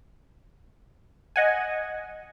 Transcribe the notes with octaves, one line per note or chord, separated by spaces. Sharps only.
D#5 F#5 G#5